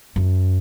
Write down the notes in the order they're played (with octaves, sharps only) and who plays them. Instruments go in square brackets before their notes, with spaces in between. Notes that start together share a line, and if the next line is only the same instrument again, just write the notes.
[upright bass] F#2